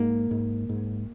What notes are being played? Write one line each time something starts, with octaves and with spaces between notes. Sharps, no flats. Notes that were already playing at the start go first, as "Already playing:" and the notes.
Already playing: G#2 A#3
G#2
G#2